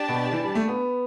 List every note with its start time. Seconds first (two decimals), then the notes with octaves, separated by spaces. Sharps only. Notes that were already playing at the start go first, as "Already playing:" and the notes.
Already playing: D4 G4 D5 A5
0.09 B2
0.32 E3
0.44 G3
0.55 A3
0.68 B3